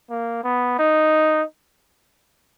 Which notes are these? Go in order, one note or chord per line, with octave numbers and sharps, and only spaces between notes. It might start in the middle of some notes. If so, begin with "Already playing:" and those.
A#3
B3
D#4